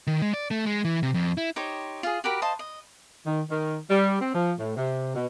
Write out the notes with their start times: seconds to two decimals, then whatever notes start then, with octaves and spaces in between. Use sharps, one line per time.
0.07 D#3
0.22 G#3
0.34 D5
0.51 A3
0.66 G#3
0.85 E3
1.03 C3
1.14 F2
1.37 E4
1.56 D#4 G4 C5 C#5
2.03 F4 G#4
2.24 F#4 G4 A#4 B5
2.42 F4 C5 D#5 A5
2.59 D#5
3.26 D#3
3.50 D#3
3.90 G3
4.21 C4
4.35 F3
4.59 A2
4.77 C3
5.16 B2